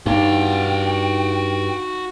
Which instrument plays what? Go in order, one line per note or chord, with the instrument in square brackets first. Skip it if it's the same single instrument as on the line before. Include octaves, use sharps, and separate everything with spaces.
[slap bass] G2 [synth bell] D#4 [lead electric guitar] F#4 F5 [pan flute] G5